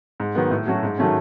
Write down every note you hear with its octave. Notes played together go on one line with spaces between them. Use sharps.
G#2
D#3 F#3 B3
A2
F#3 A3 C#4 F#4
G#2
D#3 F#3 A3 C#4